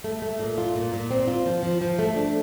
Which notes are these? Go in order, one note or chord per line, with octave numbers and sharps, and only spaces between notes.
A3
A3
A#2
F4
A#2
A#2
C4
F4
F3
F3
F3
A3
D4